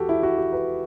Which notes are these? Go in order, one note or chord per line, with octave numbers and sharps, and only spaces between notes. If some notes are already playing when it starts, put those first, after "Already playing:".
Already playing: E2 F#4 G4 A4
E4
F#4
G4
B4